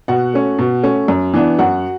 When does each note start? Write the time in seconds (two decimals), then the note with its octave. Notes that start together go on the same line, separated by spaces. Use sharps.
0.08 B2 F#4 F#5
0.34 A3 C#4
0.58 B2
0.83 A3 C#4
1.08 F#2
1.34 E3 B3 D4
1.59 F#2 F#4 F#5